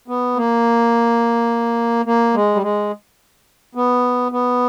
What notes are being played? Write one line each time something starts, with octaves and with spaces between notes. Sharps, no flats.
B3
A#3
A#3
G#3
G3
G#3
B3
B3